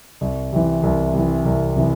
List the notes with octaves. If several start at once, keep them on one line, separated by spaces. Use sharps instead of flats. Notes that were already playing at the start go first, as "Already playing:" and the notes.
C2
C3 E3
C2
C3 E3
C2
C3 E3